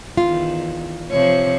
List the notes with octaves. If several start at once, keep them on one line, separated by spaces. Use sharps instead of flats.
E2 D#3 F4
C3 F3 C#5